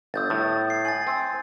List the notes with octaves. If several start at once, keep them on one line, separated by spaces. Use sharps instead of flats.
G1 D#6 G6 A6
A2 A6
G#6 C7
G#5 A6
C4